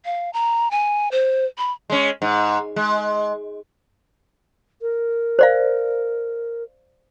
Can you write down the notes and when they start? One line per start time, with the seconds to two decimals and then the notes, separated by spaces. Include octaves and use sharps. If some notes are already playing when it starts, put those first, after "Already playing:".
0.05 F5
0.33 A#5
0.71 G#5
1.12 C5
1.58 B5
1.90 G#3 C#4
2.22 G#2
2.76 G#3
4.82 A#4
5.39 C5 D5 F5